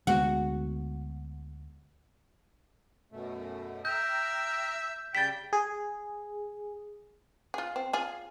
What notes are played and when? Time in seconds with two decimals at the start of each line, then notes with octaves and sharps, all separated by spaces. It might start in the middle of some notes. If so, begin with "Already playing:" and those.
0.07 D2 G#3 B3 F#4
3.12 F#2 B2 A3
3.85 E5 G5 A#5 F6 G6
5.15 C#3 G3 G5 A6 B6
5.53 G#4
7.54 F4 G#4
7.76 C4
7.93 F4 G#4